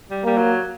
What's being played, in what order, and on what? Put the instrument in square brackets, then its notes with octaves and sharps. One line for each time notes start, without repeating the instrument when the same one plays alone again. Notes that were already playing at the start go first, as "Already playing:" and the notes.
[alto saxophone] G3
[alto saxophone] G3 [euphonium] A#3
[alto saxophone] F#3